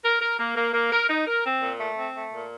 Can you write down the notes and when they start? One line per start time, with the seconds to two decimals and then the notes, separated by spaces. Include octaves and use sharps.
0.04 A#4
0.21 A#4
0.38 A#3
0.56 A#3
0.73 A#3
0.92 A#4
1.09 D#4
1.26 A#4
1.45 C4
1.61 A#2
1.79 A3
1.97 C4
2.15 A3
2.32 A#2